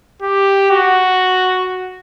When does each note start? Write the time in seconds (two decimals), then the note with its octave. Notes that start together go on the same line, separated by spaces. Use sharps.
0.22 G4
0.70 F#4